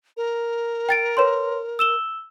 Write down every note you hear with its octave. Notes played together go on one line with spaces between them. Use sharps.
A#4
G5 A6 D7
B4 C#5 C6
E6 E7 G7